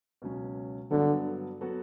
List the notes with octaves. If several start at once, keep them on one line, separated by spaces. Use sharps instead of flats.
C#2 B2 F#3 C#4
G2 D3 F#3 B3 F#4 A4
F#3 B3 F#4 A4